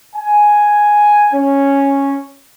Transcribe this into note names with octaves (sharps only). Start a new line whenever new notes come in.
G#5
C#4